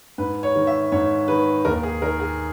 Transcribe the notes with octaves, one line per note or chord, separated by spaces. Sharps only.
G#2 B4
C#5
D#3
E5
G#2 C#5
D#3 B4
D#2 A#4
G#4
D#3 A#4
G#4